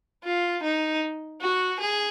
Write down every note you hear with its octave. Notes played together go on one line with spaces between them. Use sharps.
F4
D#4
F#4
G#4